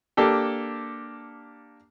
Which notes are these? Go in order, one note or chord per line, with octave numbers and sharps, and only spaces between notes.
A#3 D4 G4 A4